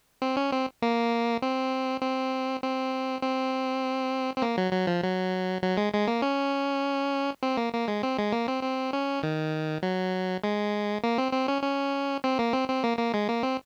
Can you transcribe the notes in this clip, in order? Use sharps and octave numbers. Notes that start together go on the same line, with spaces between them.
C4
C#4
C4
A#3
C4
C4
C4
C4
C4
A#3
F#3
F#3
F3
F#3
F#3
G#3
G#3
A#3
C#4
C4
A#3
A#3
G#3
C4
G#3
A#3
C4
C4
C#4
D#3
F#3
G#3
A#3
C4
C4
C#4
C#4
C4
A#3
C4
C4
A#3
A#3
G#3
A#3
C4